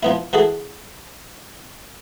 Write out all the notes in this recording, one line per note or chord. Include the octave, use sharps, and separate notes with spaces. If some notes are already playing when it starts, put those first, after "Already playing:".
F3 B3 E4
E3 F#4 G#4 A4